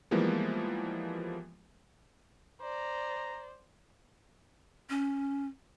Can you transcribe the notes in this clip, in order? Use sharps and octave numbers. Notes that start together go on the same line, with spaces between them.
E3 F3 G3 G#3 A#3 B3
C5 D5 A#5
C#4